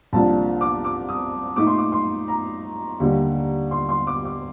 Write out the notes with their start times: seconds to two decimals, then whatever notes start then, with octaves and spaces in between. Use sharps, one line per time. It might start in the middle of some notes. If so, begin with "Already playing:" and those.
0.13 C2 A#2 F3 A#3 D4 A5
0.61 D6
0.84 D6
1.09 D#6
1.56 A#2 A3 D#4 D6
1.67 C6
1.78 D6
1.92 C6
2.28 A#5
3.00 D#2 D3 G3 A#3
3.71 C6
3.89 C6
4.07 D6
4.25 D6